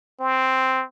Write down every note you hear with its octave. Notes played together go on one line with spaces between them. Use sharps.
C4